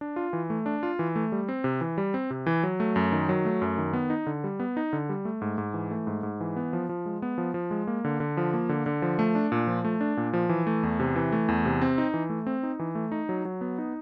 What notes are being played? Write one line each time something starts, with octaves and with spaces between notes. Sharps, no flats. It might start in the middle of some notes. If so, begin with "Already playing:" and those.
D4
F4
E3
A3
D4
F4
E3
A3
G3
C4
C3
E3
G3
C4
C3
E3
F#3
A3
F#2
D#3
F#3
A3
F#2
D#3
B3
D#4
D3
G3
B3
D#4
D3
G3
A3
G#2
G#2
E3
A3
G#2
G#2
E3
B3
F3
F3
G#3
B3
F3
F3
G#3
A#3
D3
D3
F3
A#3
D3
D3
F3
A3
D4
A#2
F3
A3
D4
A#2
F3
E3
A3
E2
C3
E3
A3
E2
C3
C4
D#4
E3
A3
C4
D#4
E3
A3
D#4
F#3
F#3
B3
D#4